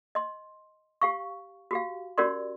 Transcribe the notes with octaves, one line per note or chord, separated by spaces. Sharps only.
D#5 C6
G4 F5 C#6
F#4 G4 F5
C#4 F#4 G4 A#4 D5 C6